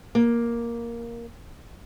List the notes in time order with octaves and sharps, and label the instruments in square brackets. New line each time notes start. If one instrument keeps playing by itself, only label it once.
[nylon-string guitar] A#3